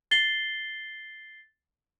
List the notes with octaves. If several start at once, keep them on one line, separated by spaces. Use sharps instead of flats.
A6 C7 G7